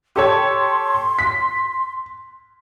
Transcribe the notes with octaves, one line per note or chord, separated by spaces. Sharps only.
G4 A4 C#5 C6
B6